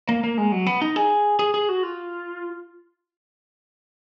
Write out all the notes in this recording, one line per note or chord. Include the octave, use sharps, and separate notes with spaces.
A#3
A#3
G#3
F#3
B3
D#4
G#4
G#4
G#4
F#4
F4